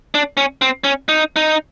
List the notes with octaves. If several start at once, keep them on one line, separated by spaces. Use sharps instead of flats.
D4
C#4
C4
C#4
D#4
D#4